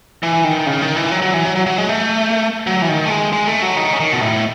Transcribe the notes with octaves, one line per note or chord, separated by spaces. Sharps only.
E3
D#3
C#3
D#3
E3
F#3
F#3
E3
F#3
F#3
F#3
G#3
A3
F#3
E3
D#3
A3
G#3
G#3
A3
F#3
D#3
C#3
D#3
B2
A2